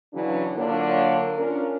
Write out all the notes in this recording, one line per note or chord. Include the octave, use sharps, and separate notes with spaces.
C#3 E3 F#3 D4
D3 F#3 A#3 D4 F4 C#5
C#4 D4 F4 A#4